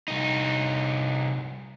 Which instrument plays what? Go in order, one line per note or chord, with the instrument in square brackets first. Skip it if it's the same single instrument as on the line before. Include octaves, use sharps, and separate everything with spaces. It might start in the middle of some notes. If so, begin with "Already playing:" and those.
[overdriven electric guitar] C2 D#4